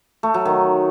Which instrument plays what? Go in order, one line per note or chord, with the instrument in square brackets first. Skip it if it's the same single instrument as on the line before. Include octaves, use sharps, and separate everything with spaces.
[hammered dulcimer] A3
F#3
D#3